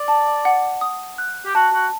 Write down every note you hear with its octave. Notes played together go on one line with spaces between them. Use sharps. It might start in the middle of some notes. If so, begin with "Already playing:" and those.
Already playing: D5
A5
F#5
D#6
F#6
G4
F#4 A5
F#4